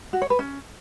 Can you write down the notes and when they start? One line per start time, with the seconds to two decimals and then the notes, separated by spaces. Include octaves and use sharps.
0.13 F#4
0.22 C#5
0.30 B4
0.39 C#4